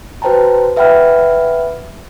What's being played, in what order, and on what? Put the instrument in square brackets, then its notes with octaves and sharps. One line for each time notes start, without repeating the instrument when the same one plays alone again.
[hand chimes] F#4 B4 C5 G5 A5 A#5
B4 E5 F#5 G5 B5 F6